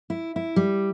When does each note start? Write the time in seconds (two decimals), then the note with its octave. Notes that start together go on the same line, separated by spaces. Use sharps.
0.10 E4
0.36 E4
0.56 G3